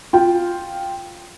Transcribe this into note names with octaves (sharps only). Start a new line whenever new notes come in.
F4 G5